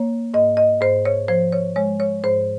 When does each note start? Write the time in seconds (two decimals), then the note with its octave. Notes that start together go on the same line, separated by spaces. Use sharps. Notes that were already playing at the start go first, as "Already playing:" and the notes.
Already playing: A#3 C#5
0.34 G#2 D#5
0.57 D#5
0.81 G#2 C5
1.05 C#5
1.28 F3 C5
1.52 C#5
1.76 G#3 C#5
2.00 C#5
2.24 G#2 C5